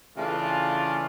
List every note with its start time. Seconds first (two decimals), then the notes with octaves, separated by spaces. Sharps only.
0.16 C#3 E3 A3 D4 F4